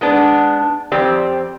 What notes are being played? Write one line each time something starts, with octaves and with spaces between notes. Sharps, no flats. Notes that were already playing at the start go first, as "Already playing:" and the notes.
G#3 B3 D4
F2 C4 G4 D5